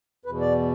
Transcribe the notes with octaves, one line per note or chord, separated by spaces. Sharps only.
E2 B2 B4
D5